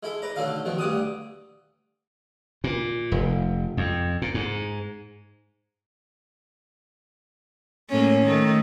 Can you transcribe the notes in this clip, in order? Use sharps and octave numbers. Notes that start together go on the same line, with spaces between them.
G#3 E4 A4 E5
B4 D5 A#5
B1 D3 F#3 A3 F5 A5
B2 D#3 F3 F#3
D2 G2 D5 F#5 D#6
A#2
F1
F2
A#2
G#2
A2 A#3 C#4
D#3 A3